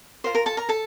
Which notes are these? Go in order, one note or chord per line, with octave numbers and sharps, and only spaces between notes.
F4 A#4 C5 C6
A#4 A#5
A4 A5
A#4 A#5
A4 A5